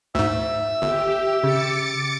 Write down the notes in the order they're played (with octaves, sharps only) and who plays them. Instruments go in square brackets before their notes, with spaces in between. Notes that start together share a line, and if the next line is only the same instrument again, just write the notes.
[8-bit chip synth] D2 G#2 [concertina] E5 E6
[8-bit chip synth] G1 [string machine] G4
[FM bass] C#3 [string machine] D6 A6 C#7